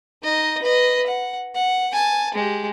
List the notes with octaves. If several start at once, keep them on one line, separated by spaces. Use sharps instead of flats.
D#4 D#5
B4 D#5
F#5
F#5
G#5 A5
G#3 G4